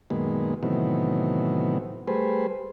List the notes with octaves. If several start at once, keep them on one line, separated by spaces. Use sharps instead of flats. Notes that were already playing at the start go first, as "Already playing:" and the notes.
F#2 A#2 D#3 G#3 B3
A2 C3 D#3 E3 F#3 B3
G3 A3 G#4 B4 C5